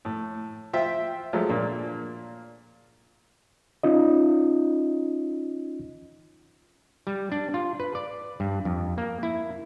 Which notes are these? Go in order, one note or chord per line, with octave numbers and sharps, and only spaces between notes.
A2
F4 C5 E5 G5
F3 F#3 G#3 A3
A#2 A#3 D4
C#4 D#4 F4 D#5
G3
D4
F4
B4
D5
G2
F2
A#3
E4